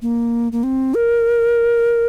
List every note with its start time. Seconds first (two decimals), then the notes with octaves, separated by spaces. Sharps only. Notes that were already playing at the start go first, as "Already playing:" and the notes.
0.02 A#3
0.52 A#3
0.63 C4
0.94 A#4